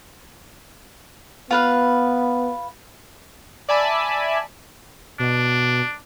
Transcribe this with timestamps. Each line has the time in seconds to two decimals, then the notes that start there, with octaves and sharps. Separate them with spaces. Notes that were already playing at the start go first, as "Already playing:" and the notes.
1.51 B3 F4 B4 F5
3.69 D5 E5 G#5 A5 B5
5.19 B2 D4